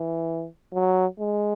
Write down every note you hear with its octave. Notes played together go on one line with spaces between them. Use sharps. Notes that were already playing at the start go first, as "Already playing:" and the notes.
Already playing: E3
F#3
G#3